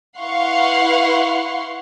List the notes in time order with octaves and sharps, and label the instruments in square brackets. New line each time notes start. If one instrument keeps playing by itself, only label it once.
[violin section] E4 B4 F5 F#5 C6 C#6